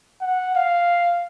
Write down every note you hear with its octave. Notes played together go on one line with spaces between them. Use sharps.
F#5
F5